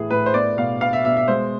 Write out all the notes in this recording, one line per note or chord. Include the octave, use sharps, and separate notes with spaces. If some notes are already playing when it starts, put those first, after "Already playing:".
Already playing: A2 E3 B3 G#4
A2 B4
C5
B3 D5
B2 F5
B3 F5
E5
B2 E5
E5
G#3 C5